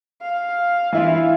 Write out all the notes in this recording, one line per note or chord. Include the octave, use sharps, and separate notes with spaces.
F5
E3 E4 F4